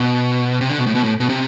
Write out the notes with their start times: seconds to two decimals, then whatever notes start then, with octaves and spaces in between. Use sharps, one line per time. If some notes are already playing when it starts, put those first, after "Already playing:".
Already playing: B2
0.61 C3
0.70 D3
0.78 B2
0.86 A2
0.95 B2
1.03 A2
1.20 B2
1.29 C3